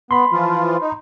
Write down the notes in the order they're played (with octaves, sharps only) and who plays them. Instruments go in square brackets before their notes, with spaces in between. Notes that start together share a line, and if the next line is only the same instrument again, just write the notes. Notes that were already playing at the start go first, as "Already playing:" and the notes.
[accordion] B3 [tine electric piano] B5 C6
[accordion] E3 F3 F4
D#4